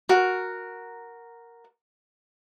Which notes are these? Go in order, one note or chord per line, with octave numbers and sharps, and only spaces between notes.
F#4 A#4